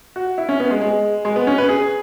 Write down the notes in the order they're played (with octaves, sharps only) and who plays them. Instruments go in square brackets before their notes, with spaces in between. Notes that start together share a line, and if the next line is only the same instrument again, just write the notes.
[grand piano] F#4
E4
C#4
B3
G#3
G#3
G#3
B3
C#4
B4
G#4